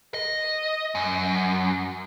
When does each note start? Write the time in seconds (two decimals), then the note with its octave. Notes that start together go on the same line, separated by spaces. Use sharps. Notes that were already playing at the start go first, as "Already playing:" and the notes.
0.14 D#5
0.95 F#2